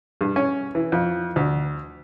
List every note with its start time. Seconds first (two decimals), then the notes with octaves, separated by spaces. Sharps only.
0.21 G2
0.36 C#4
0.75 E3
0.92 F2
1.36 D2